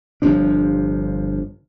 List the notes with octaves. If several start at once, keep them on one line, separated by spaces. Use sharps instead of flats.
G1 C3 F3 D4